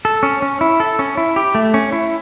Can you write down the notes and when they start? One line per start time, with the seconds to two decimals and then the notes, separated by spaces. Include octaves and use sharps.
0.05 A4
0.23 C#4
0.42 C#4
0.61 E4
0.80 A4
0.99 C#4
1.17 E4
1.36 G4
1.55 A3
1.74 C#4
1.92 E4